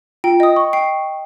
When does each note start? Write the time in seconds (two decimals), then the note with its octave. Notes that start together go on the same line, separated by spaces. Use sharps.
0.24 F4 G5
0.40 D#5 D#6
0.56 C#6
0.73 G5 C7